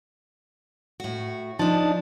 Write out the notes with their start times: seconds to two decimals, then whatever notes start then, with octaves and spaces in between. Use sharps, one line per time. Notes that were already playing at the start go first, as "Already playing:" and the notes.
1.00 A2 F#4
1.59 F3 D4 D#4 A5